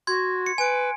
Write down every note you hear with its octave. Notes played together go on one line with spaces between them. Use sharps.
F#4 C6 G#6
C#7
B4 G#5 D7